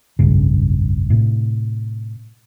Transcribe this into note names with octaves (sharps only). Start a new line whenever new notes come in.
F1 B1 G2 C#3
A2 C3